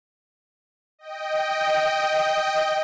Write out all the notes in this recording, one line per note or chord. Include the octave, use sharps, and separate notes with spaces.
D#5 G5